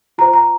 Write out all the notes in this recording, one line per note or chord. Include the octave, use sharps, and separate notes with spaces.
F4 C5 A#5
A#5